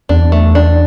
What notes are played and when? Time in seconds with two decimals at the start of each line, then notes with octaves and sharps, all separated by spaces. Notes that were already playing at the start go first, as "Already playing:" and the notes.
0.09 E2 D4
0.32 A3
0.55 D4